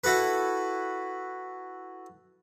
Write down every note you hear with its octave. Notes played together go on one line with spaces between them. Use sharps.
E4 F#4 A4 B4